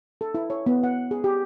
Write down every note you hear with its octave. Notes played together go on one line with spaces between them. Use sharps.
A4
E4
C#5
B3
F#5
G#4
G4